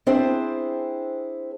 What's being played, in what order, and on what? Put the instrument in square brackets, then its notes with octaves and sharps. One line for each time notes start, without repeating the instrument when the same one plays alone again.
[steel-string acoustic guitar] C4 D4 E4 G#4 C5